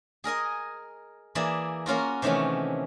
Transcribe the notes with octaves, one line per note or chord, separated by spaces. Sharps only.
G#4 A#4 D#5 G#5
E3 A#3 G#4 D5 E5
A#3 C#4 F4 F#4
C3 D#3 E3 A3 C#4